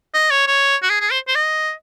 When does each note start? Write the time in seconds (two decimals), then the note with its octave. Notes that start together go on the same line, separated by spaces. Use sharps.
0.14 D#5
0.30 C#5
0.47 C#5
0.83 F#4
0.90 G#4
1.00 G#4
1.11 C5
1.28 C5
1.35 D#5